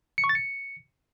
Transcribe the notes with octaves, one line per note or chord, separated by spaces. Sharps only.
C#7
C#6
A6
C#7